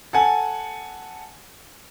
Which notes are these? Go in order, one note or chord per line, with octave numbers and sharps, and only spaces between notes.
A4 F#5 G#5